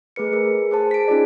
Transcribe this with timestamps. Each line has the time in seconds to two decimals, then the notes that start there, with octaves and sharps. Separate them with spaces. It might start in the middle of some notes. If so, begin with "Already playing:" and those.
0.16 A3 G#4 B4 C#7
0.33 G#4 A#4
0.71 G#4 C5 A5
0.91 B6 D7
1.08 C#4 D#4 F4 G#4 D5